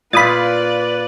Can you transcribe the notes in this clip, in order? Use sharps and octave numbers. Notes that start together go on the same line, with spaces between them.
A#2 F4 B4 D5 B5 D#6 A6